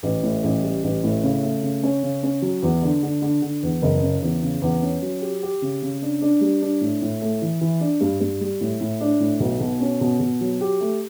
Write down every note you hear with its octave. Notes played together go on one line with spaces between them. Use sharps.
A1
A2
A1
G3
A1
A2
C#3
A3
C#3
C#4
C#3
C#4
F#3
E2
D3
D3
D3
D3
E2
F#1
C#3
E2
C#3
E2
C#4
F#3
G4
G4
C#3
C#3
D4
D4
G3
D4
A2
A2
A3
E3
E3
D4
G2
G2
G3
A2
A2
D4
A2
B1
B2
C#4
B2
B2
F#3
G4
A3